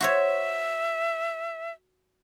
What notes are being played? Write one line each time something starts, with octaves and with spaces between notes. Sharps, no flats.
F#4 C5 C#5 E5